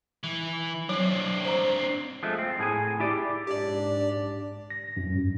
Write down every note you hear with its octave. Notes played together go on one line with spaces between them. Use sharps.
E3
F#3 C4 D4
C5 A#5
F3 G#3 A3
C4
A2 G#4 G#5
E4 G4 D5
G#2 D4 G4 D5
A#6
F#2
G2